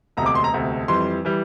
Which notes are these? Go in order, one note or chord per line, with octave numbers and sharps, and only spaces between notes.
E1 D2 C3 A#5
D6
C6
A#5
E1 D2 C3
F2 E3 G3 C6
E3 G3